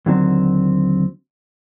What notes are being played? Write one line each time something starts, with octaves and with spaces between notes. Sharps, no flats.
D#2 D3 F#3 C4